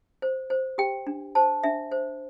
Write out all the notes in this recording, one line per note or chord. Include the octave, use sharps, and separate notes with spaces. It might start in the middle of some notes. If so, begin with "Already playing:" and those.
C5
C5
G4 G5
D4
C5 A5
D4 E5
C5